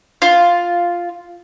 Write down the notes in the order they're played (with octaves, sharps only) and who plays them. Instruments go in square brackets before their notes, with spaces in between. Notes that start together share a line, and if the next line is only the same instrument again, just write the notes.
[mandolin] F4